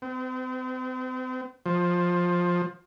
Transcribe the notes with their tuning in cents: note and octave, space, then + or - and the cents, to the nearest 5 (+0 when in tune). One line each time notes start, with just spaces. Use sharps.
C4 -40
F3 +15